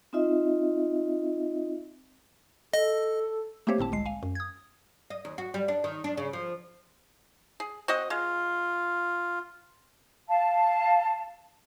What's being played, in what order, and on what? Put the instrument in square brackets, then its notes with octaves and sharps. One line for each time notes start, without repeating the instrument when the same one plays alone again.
[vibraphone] C4 D#4 F4 D#5 E5
[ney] A4 [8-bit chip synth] D#5
[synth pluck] A3 A#3 C4 G4 C5 C#5
G1 A2 C4 A5
G1 C2 G#3 C7
F5 G#5
F#2
D#6 G#6
[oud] D#5
D#2
F#4
G3
D4
D#3
D4
C#3
F3
[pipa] G#4
[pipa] C4 F#4 D#5 [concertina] F#5
[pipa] G#3 [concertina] F4
[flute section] F5 A5